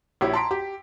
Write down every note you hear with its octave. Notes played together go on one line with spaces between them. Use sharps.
A#1 E4 G4 C#5
A5 A#5 C6 B6 D7
G4